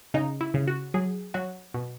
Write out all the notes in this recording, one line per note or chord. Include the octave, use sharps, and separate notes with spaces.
C#3 D#4
E4
C#3
F#4
F#3 G#4
F#3 F#4
B2